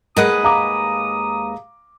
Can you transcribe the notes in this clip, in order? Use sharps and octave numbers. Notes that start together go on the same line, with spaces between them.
D#2 G#3 A#4 B4 D#5 F#5 D#6
F5 A#5 D6